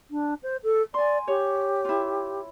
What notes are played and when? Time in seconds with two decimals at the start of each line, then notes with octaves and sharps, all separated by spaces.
0.10 D4
0.43 C5
0.63 A4
0.94 D5 G#5 C6
1.28 G4 C#5
1.85 E4 F4